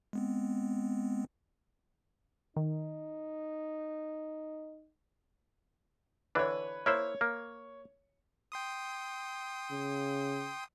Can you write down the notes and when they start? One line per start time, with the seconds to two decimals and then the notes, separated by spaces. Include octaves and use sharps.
0.13 G#3 B3 C4
2.56 D#3 D#4
6.35 D3 E3 D4 B4 C#5
6.86 A#3 E4 C5 C#5
7.21 A#3
8.52 G5 C6 D#6
9.71 C#3